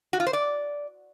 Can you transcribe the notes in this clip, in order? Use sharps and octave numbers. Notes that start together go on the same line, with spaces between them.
F#4
F4
C5
D5